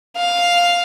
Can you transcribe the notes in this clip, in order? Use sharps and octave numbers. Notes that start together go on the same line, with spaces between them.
F5